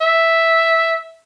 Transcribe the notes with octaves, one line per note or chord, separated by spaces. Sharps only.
E5